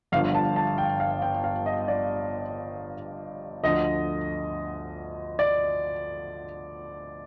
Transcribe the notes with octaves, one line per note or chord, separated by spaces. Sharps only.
G1 G2 D3 F3 F5
A5
A5
G5
F5
G5
F5
D#5
D5
D2 D3 F3 D#5
D5